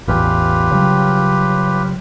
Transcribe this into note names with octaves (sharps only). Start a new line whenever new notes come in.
A1 E2 F4 G4 B4
C#3 F#3 G3